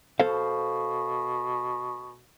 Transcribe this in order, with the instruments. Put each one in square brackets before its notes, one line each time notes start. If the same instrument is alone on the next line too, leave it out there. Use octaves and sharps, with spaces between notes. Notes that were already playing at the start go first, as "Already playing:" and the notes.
[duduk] B2 [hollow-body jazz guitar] A4 C5 F5